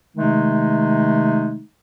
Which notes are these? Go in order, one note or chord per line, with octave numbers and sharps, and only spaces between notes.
C3 D#3 G#3 A3 D#4